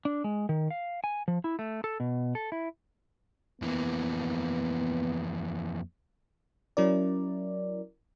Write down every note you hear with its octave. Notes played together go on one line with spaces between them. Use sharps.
D4
G#3
D#3
F5
G#5
F3
E4
A3
A4
B2
A4
E4
F2 E3 A#3 B3
F#3 C#4 E4 A#4 D5